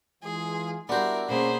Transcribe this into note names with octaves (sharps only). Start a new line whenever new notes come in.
E3 G#3 F4 G#4
G3 B3 D4 E4 F#4 A#4 C5
B2 A#3 C#4 G#4 C5 B5